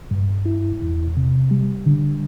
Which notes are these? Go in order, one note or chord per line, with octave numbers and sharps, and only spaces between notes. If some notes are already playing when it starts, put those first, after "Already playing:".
G2
E4
E2
C3
G3
D3